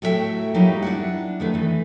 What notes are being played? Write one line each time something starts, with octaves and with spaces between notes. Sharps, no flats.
A2 F#3 A3 F4 E5 G5
F#3 G3 A#3 D#4 F4
D4 E4 F#5
D#3 A3 B4
E3 A3